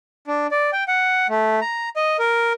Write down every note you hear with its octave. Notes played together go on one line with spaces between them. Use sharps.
D4
D5
G5
F#5
A3
A#5
D#5
A#4